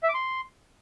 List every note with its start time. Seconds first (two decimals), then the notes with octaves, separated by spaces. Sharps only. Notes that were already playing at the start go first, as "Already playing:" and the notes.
0.03 E5
0.09 D6
0.14 C6